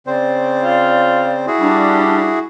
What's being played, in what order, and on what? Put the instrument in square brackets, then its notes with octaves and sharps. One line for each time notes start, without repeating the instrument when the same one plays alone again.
[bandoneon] C#3 C4 C5 [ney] D5
[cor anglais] F4
[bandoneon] E4 F#4 G#4
[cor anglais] G3 [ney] D4